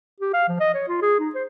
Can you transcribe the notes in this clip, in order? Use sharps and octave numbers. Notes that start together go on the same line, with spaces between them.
G4
F5
F3
D#5
C#5
F4
G#4
D#4
C5